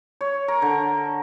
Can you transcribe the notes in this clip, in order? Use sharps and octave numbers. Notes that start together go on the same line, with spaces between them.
C#5
A#4
D3